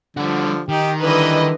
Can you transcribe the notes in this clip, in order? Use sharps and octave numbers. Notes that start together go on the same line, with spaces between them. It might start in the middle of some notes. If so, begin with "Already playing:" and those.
D3 F3 G3 F#4
D#3 D#4 G4
D3 E3 G3 B4 D#5